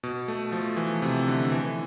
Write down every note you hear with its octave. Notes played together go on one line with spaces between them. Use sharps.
B2
A3
F3
E3
C3
D3
E3